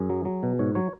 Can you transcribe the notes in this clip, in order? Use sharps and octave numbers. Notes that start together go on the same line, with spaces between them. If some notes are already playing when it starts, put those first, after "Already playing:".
Already playing: F#2 G#4
F#3
F#3
B2
G#2 C#5
F#3 C#5